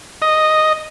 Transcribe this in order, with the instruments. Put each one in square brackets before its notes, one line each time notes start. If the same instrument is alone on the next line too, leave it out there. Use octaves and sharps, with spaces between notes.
[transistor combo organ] D#5